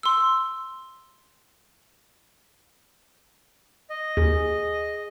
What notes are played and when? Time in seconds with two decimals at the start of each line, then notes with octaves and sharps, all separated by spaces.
0.03 C6 E6
3.90 D#5
4.17 D#2 G#4